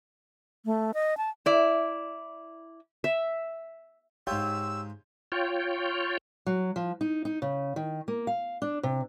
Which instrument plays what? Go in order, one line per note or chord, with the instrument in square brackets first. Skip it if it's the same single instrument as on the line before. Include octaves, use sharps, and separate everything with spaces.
[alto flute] A3
D#5
A5
[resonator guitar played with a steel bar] E4 D5
[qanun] E5
[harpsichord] G#2 F4 [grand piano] G4 C#5 G6 [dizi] E6
[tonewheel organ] F4 C#5 G5
[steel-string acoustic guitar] F#3
F3
D#4
D#4
C#3
D#3
A#3
F5
D4
C3